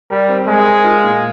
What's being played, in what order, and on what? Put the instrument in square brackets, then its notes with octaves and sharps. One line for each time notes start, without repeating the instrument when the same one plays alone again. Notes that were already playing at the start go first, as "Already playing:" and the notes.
[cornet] G3 [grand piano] A#4
[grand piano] C4
[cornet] G#3 [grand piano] A#4
[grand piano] A#4
F4
A#2